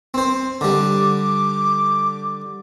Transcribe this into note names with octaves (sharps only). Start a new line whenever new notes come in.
C4 C5
D3 G3 D6